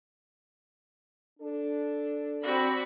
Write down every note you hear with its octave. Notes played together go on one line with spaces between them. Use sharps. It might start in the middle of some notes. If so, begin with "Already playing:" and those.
D4 A4
C4 F#4 D5 B5